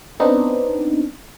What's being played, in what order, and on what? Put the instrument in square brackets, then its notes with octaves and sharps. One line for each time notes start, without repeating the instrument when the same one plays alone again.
[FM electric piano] B3 C4 D4 D#4